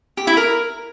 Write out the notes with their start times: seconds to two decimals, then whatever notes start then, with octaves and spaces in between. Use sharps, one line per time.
0.17 G4
0.27 E4
0.37 A#4